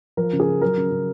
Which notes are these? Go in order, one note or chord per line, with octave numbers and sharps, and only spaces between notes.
F3 A#4
C#3
G#4
C#3
F#3 A#4
C#3
C#3